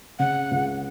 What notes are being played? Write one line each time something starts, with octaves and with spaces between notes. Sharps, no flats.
C#3 F#5
C#2